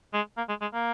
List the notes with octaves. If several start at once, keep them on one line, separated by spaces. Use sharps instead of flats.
G#3
A#3
G#3
G#3
A#3